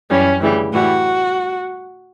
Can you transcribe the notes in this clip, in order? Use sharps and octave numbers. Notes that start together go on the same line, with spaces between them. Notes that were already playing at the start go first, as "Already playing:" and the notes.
F#2 E3 G3 C#4
D2 C#3 E3 G3
A2 E3 G3 F#4